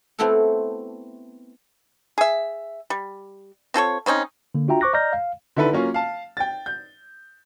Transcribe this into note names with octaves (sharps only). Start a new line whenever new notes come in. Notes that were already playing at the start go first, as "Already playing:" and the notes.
A3 B3 C4 E4 F#4 A4
G#4 E5
G3
C4 F4 A4 C#5
C#3 C4 C#4 D#4
D3 A#3
D4 F4 F#4 E5 G5 A#5
C5 C#6 D6 F#6 A#6
D5 D#5 A#5 F6 G6 A#6
F5
D3 D#3 E4 A4 B4
F#3 A#3 C#4 F4
F5 A5
G5 A6
G6